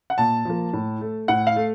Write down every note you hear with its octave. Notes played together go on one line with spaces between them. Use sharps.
F#5
A#2 A5
F3 A#3
A2
A3
A2 F#5
F5
A3